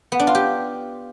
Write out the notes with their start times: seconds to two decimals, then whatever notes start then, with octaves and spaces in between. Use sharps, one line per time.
0.12 B3
0.19 D4
0.27 F4
0.35 G4